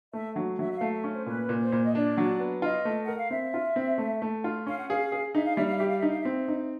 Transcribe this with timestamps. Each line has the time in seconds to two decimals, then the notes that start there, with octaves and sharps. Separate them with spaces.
0.13 A3 E5
0.36 F#3
0.59 F#3 E5
0.72 E5
0.75 F5
0.81 A3
0.92 E5
1.04 C#4
1.10 C5
1.26 A#2 B4
1.49 A#2
1.61 C5
1.72 A#2
1.84 D#5
1.94 D4 D5
2.17 F#3
2.39 B3
2.62 F4 D#5
2.85 A3
3.04 A#4 F#5
3.18 F5
3.30 C4 E5
3.54 F4
3.76 C4
3.98 A3
4.22 A3
4.44 F4
4.67 C#4 F5
4.77 F#5
4.89 G#4 F5
5.12 G#4
5.35 D#4 E5
5.45 F5
5.56 G3 E5
5.66 F5
5.77 G4 E5
5.88 F5
5.99 D#4 E5
6.09 F5
6.20 E5
6.25 C4
6.48 D#4